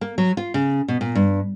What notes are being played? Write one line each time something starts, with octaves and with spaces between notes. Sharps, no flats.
A#3
F#3
F4
C#3
B2
A#2
G2